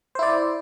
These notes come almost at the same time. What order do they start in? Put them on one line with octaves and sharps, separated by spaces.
C5 E4 D5